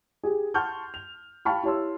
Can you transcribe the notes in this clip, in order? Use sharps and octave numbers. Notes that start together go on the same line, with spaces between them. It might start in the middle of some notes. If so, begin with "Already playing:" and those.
G4 G#4
F#5 A5 C6 C#6 F6 G6
F7
F5 G5 A5 B5 C#6 F6
E4 G4 C#5 A5 C6 E6